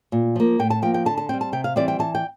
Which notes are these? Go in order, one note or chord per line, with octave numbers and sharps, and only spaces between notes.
A#2
F3 A#3
A2 G5
A5
F3 A#3 G5
G5
D3 A5
A5
G3 C4 G5
A5
C3 G5
F5
E3 G3 C4 D5
G5
E3 A5
G5